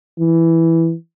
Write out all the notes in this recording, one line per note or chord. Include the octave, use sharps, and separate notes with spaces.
E3